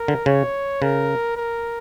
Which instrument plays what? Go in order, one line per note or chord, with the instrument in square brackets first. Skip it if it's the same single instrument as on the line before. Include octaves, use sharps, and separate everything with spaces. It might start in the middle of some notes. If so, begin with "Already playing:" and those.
Already playing: [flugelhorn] A#4
[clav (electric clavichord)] D3
[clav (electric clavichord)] C#3 [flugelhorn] C#5
[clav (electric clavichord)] C#3 [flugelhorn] A#4
[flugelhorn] A#4